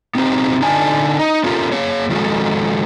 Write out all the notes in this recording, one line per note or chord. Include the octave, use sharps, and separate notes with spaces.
B3 C4 D#4 F#4 G4 C5
D3 D#4 D5 G#5 A5
D#4
B3 C#4 F4 G4 A4 A#4
A#3 G#4 C#5
D#3 F3 G#3 F#4 A4